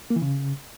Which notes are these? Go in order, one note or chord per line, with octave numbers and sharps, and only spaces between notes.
A#3
E3
C#3